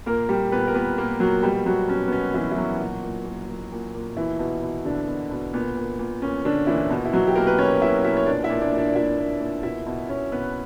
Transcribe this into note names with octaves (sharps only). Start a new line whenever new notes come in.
A#2 A#3 A#4
A#2 G3 G4
A#2 B3 B4
A#4
A#2 B3 B4
A#2 A#3 A#4
A#2 F#3 F#4
B2 G3 G4
B2 F#3 F#4
B2 C#4
B3
B2 C#4
B2 E3 E4
E4
B2 F#3 F#4
A#2
A#2
A#2
A#2
A#2
A#2
B2 E3 E4
B2
B2
B2 D3 D4
B2
B2
A#2 B3
A#2
A#2
A#2 C#4
A#2 D3 D4
A#2 E3 E4
B2
E4
B2 F#3 F#4
G4
B2 A#3 A#4
B4
B2 C#4 C#5
B2 E4 E5
B2 E4 E5
C#5
A#2 D4 D5
E4 E5
A#2
D4 D5
A#2
D4 D5
D5
A#2 E4 E5
A#2
A#2
B2 E4 E5
B2
B2 C#4 C#5
B2 B3 B4